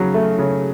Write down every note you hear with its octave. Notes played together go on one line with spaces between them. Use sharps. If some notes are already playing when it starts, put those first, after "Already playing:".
Already playing: C#3 F#3 C#4
A3
C#3